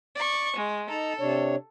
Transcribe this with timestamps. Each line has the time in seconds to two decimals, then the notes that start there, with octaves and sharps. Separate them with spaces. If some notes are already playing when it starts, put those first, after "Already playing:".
0.15 D5 C#6
0.56 G#3
0.90 D#4 A4 A#5
1.20 C3 D4 C#5